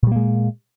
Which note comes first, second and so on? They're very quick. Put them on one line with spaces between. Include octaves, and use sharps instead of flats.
A#2 G3 A#3 G#3